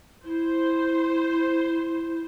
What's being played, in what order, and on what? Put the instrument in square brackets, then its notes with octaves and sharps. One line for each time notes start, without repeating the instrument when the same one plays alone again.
[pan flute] E4 [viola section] C5